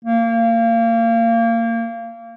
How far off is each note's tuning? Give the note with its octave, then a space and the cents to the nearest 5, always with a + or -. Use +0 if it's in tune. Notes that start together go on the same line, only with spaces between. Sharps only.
A#3 -25